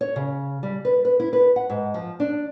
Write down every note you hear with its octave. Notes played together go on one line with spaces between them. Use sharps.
C#5
C#3
G3
B4
B4
E4
B4
F#5
G#2
F3
D4